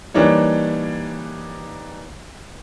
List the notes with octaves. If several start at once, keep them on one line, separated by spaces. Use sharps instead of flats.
E3 G3 A#3 D4 D#4 C#5